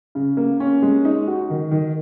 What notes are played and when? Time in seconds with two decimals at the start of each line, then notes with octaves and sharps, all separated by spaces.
0.15 C#3
0.37 A#3
0.60 C#4
0.82 G#3
1.05 D#4
1.27 F#4
1.50 D#3
1.71 D#3